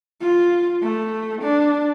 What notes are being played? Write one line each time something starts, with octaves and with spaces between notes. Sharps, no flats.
F4
A3
D4